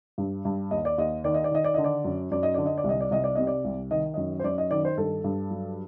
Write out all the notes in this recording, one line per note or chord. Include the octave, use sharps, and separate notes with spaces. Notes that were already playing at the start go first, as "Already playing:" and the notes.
G2
G2
D#2 D#5
D5
D#2 D#5
D#3 D5
D#5
D5
D#3 D#5
D5
D3 D#5
D5
F#2
F#2 D5
D#5
D3 D5
D#5
D5
C2 D#5
D5
C2 D#5
D5
C3 D#5
D5
C2
D#3 D#5
F#2 D#5
C5
F#2 D5
D#5
D#3 D5
C5
G2 A4
G2
F#3